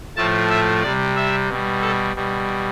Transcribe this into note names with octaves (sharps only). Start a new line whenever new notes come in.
A2 F3 A3 A5
E5
C3 G3 D5
E5
B2 G3
A4
B2 G3